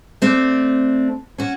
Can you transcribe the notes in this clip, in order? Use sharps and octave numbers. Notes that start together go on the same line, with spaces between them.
A3 C4 D4
C#4 F#4